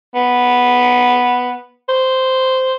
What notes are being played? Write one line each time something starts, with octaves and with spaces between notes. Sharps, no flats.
B3
C5